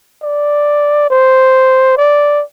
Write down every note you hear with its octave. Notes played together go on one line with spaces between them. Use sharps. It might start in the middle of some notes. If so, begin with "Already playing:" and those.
D5
C5
D5